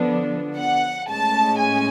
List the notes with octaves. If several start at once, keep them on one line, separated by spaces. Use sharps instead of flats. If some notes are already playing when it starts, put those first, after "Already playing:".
Already playing: D3 F3 B3 D4
F#5
A2 G#3 C#4 A5
G#5